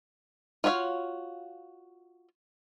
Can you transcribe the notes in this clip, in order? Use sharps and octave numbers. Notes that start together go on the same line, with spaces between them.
F4 F#4 C#5 E5 F5